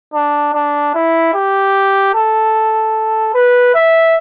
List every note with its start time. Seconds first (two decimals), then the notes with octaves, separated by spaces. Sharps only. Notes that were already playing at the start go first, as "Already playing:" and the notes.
0.14 D4
0.54 D4
0.94 E4
1.34 G4
2.14 A4
3.34 B4
3.74 E5